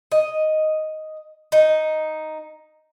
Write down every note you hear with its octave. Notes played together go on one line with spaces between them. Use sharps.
D#5
D#4